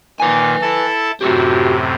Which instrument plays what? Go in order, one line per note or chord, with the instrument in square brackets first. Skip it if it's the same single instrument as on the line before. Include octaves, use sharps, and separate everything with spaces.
[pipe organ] A#2 D#3 [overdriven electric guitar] B4 G#5
[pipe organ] E4 A4 A5
[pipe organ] F#2 A2 C3 [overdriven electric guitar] F#4 G4